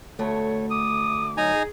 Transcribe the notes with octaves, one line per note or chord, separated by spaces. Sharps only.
D2 A3 C#5
D6 D#6
F#3 D#4 G#5 A#5
G#4